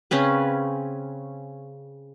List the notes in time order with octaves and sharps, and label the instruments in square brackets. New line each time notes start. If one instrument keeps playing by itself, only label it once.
[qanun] C#3 C4 C#4 B4